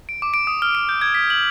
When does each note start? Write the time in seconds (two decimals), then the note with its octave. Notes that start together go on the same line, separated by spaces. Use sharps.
0.09 D7
0.22 D6
0.34 D7
0.47 D#6
0.62 F6
0.75 D7
0.89 G6
1.02 G#6
1.15 B6
1.30 F#7